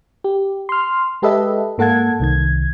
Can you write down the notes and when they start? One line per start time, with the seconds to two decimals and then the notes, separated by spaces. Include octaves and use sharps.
0.24 G4
0.69 C6 F6
1.22 G#3 G4 A4 B4 D#5 E5
1.78 G#2 A#3 A4 F#5 A5 G#6
2.20 C2 D#3 G#6